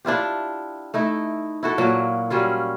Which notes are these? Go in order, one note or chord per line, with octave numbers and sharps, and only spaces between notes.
D4 E4 F4 G4
A3 D#4 E4
E4 F#4 A4
A#2 F#3 A#3
F#3 G3 C#4 F4